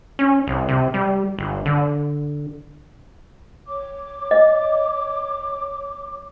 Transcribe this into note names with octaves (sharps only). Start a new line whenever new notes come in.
C#4
C2
C3
G3
G1
D3
C#5 D6
D#5